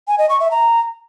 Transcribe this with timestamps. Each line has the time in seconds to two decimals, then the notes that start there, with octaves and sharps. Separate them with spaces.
0.08 G#5
0.19 D#5
0.29 C#6
0.40 E5
0.51 A#5